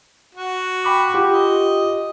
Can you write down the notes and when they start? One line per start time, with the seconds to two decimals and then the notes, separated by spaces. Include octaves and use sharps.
0.35 F#4
0.85 G5 B5 D6
1.14 F4 G4
1.30 D#5